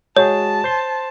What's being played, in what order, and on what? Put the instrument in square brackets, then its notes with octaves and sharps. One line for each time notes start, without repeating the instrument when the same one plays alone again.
[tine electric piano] G#3 F#4 G#4 [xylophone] C#5 [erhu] A5
[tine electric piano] C5 C6